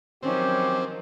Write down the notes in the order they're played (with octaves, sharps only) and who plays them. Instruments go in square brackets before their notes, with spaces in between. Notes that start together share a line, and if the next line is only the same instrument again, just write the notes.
[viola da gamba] D#3 F3 F#3 [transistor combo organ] C4 [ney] C#4 [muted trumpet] G4